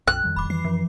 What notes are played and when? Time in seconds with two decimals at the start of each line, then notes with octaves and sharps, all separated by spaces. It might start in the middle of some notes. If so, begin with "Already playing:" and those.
0.08 A#1 F2 F#6
0.23 F2 D#3 G3
0.36 D#1 B5 D6
0.50 E3 C7
0.64 F#2 F3